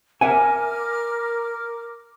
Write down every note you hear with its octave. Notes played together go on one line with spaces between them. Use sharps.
A#4 E5 F#5 G#5 D6 F6